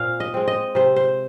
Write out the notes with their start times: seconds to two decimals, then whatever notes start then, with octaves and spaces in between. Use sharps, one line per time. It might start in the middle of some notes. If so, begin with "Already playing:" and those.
Already playing: A#2 C4 F5
0.20 D#5
0.34 G#3 C4
0.48 D#5
0.75 C3 C5
0.96 C5